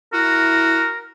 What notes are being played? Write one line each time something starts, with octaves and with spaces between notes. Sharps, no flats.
E4 F#4 A#4